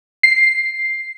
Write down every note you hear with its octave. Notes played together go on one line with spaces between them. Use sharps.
C7